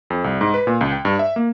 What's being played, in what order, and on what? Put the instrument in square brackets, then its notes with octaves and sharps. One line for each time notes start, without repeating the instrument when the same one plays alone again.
[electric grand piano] F2
C2
G#2
B4
A#2
C#2
G5
G2
E5
A#3